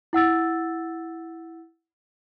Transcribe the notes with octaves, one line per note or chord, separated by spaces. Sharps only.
E4 F#5 E6 A6